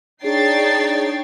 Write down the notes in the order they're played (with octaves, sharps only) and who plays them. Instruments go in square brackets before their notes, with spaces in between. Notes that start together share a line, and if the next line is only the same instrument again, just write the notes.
[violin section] D4 C#5 G5 [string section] D#4 A6 C7 [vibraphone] G#4